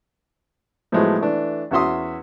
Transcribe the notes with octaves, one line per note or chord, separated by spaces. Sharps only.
A2 F3 F#3 G#3 A3 B3
E3 A3 D4
E2 C#4 F#4 E5 C6 D#6